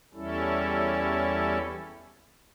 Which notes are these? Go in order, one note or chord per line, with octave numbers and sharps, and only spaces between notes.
E2 G3 C#4 E4 A4